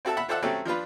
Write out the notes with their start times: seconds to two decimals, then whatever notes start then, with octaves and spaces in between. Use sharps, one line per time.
0.05 C4 F#4 A4 E5 A5
0.17 E5 F#5 B5 E6 F#6
0.28 F4 A4 C5 D5 E5 F#5
0.42 F#3 A3 C4 C#4 G4 A4
0.65 F3 D4 F4 B4